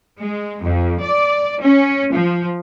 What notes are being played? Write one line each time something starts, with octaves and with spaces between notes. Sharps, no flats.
G#3
F2
D5
C#4
F3